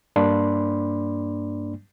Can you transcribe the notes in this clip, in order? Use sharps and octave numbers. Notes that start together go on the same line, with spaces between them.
G2 A#3 D4 D5 B5 C6